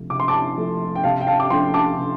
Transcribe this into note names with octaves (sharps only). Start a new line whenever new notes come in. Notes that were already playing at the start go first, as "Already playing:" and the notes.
Already playing: C3 F3 A3
C3 D6
C6
A5 D6
F3 A3
G5
C3 F5 A5
G5
F5 A5
D6
F3 A3 G5 C6
A5 D6
C3